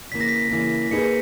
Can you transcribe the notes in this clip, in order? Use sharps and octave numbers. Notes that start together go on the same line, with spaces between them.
C#3 E3 A#3 B6
A#6
B6
C#3 E3 A#3
A#2 A#3 D#4 G#4 B4 C#7